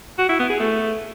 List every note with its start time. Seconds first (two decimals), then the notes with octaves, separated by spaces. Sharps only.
0.18 F#4
0.29 E4
0.39 B3
0.49 G#4
0.60 A3